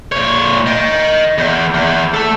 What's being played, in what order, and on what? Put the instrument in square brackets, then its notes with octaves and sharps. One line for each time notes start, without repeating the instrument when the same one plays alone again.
[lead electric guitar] A#2 C#5
D#5 G5
E2
E2
A3 A4